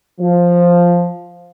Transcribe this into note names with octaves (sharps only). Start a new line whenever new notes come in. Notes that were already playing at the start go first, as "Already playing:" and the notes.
F3